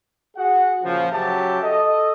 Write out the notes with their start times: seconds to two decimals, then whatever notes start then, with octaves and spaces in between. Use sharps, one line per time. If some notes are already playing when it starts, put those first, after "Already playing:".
0.37 F#4 G#4 F#5
0.83 A#2 C#3 F3
1.12 C#3 F#3 G4 E5 A5
1.63 A4 D#5